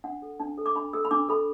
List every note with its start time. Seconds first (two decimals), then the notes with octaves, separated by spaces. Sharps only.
0.04 D4 F#5
0.22 A4
0.40 D4 A5
0.58 A4
0.66 D6
0.76 D4 B5
0.93 A4 E6
1.05 B5
1.11 D4 D6
1.29 A4 B5